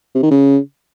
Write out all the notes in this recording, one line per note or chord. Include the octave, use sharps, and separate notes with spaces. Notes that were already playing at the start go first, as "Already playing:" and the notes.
C3
D#3
C#3